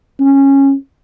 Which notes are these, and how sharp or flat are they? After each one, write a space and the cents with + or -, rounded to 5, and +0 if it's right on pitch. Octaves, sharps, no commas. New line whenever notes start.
C#4 -15